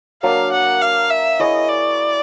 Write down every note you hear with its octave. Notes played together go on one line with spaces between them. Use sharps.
F#3 A#3 D4 F5
F#5
F5
E5
E4 G#4 C#5 D#5
D5